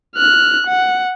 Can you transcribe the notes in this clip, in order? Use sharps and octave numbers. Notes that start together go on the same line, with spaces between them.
F6 F#6
F#5